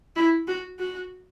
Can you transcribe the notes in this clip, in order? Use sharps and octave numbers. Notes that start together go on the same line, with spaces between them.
E4
F#4
F#4